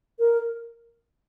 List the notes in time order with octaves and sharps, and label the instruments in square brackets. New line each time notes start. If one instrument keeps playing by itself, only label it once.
[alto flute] A#4